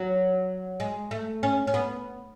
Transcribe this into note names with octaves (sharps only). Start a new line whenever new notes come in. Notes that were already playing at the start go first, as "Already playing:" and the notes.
Already playing: F#3
G#3
A3
C#4
C#4
B3